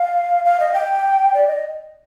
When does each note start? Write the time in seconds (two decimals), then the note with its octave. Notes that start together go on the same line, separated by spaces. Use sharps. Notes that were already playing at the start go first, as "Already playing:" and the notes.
Already playing: F5
0.45 F5
0.60 D#5
0.74 G5
1.34 D5
1.47 D#5